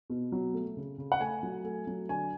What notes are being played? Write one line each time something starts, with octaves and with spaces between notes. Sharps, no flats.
B2
F#3
A3
C#3
C#3
F#5
A3 G#5
F#3
A3
F#3
D3 G#5